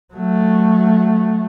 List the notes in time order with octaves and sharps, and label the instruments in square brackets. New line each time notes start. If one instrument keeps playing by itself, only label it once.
[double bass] F#3 A3